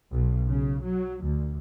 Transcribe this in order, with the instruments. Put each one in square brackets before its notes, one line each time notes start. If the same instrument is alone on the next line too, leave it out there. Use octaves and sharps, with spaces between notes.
[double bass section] B1
C#3
F#3
D2